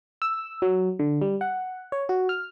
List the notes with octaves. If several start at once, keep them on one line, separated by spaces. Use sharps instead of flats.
E6
F#3
D3
G3
F#5
C#5
F#4
F6